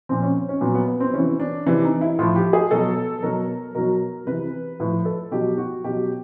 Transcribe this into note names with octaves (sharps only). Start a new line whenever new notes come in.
A#2 F3 C4
C#4
C#4
A#2 F#3 B3
B3
B3
C4
C3 E3 C#4
D4
C3 E3 D4
D#4
E4
A2 F3 F4
G4
G#4
B2 F#3 A4
B2 F#3 A#4
B2 F#3 A#4
C3 E3 B4
A2 F3 B4
A4
B2 F#3 G4
F#4
B2 F#3 G4